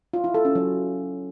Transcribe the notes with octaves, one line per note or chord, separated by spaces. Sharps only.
F4
E4
A4
C#4
F#3